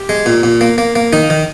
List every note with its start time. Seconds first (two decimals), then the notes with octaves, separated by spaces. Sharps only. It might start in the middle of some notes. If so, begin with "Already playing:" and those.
Already playing: G4
0.09 G#3
0.26 A#2
0.43 A#2
0.61 A#3
0.78 A#3
0.96 A#3
1.13 D#3 D#4
1.30 D#3